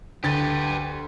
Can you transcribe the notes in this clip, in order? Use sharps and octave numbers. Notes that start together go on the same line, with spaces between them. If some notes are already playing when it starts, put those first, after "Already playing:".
D2 G4 B4 A6